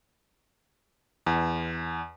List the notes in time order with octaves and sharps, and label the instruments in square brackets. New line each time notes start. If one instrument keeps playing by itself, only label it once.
[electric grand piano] E2